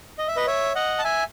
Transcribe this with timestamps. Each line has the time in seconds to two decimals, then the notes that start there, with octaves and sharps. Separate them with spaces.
0.18 D#5
0.28 E5
0.36 B4 D#5
0.47 C#5 E5
0.75 D#5 F#5
0.99 A5
1.04 E5 G#5